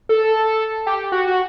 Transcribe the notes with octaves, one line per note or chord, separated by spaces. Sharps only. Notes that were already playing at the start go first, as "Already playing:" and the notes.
A4
G4
F#4
F#4